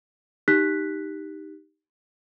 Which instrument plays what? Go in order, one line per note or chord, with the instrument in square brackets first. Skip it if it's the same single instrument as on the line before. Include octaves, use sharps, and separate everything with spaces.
[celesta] D#4 G4 F#6 B6